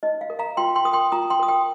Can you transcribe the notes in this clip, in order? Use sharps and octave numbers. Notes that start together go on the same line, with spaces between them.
D#4 D#5
F5
A#4
F5 A#5
F4 G5 C6
G5 C6
A#4 D#6
G5 C6
F4 A#5 D#6
G5 C6
A#4 D#6
G5 C6